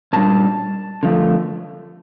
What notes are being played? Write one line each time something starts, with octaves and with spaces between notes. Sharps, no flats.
A#2 G3 D4 A5
D3 F3 A3